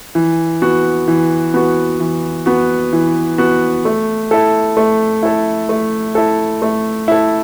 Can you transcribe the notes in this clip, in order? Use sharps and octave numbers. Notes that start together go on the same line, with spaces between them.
E3
B3 F#4
E3
B3 F#4
E3
B3 F#4
E3
B3 F#4
A3
E4 A4
A3
E4 A4
A3
E4 A4
A3
E4 A4